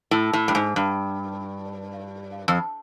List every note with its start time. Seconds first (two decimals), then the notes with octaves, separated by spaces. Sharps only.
0.11 A2
0.33 A2
0.48 G2
0.55 G#2
0.76 G2
2.48 F2